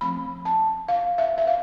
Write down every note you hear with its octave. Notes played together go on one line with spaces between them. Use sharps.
F3 A3 C4 B5
A5
F5
E5
E5
F5